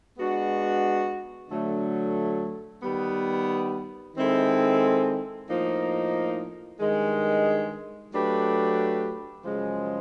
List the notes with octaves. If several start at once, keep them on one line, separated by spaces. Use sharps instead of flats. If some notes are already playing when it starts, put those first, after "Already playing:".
G#3 B3 D4 F#4
D3 F#3 A3
D#3 G3 B3
D#3 G#3 C4 E4 A4
A2 F3 A#3 D#4
G2 D#3 G#3
F#3 A3 D4 G4 B4
F#2 C#3 F3 G#3